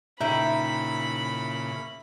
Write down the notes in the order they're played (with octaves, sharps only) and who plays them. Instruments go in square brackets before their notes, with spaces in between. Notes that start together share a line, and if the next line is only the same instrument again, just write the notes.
[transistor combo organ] A#2 C#3 [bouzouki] D#4 E4 G5 [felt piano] E5 [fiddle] B5